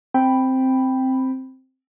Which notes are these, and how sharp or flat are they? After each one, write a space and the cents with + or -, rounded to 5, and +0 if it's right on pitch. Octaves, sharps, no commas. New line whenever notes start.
C4 +0 G5 +0 B5 +0